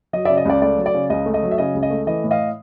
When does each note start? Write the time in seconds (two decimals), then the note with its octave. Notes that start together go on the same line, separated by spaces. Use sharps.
0.13 F#3 D#5
0.25 D5 E5
0.29 C#3
0.37 D#5
0.45 C#2 D5
0.62 A3 D5
0.77 F#3
0.86 D5
0.95 C#3
1.10 C#2 D#5
1.26 A3
1.34 D#5
1.43 F#3
1.51 E5
1.58 C#3 D#5
1.75 C#2
1.83 D#5
1.90 A3
2.07 E3 D#5
2.24 A2
2.31 D#5 F5